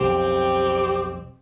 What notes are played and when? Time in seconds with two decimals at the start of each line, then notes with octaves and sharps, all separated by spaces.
0.01 B1 F2 C4 G4